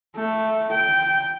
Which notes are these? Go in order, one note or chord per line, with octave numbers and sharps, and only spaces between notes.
A3
G5